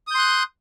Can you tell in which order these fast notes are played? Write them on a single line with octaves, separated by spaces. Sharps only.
D#6 G6 C6 F#6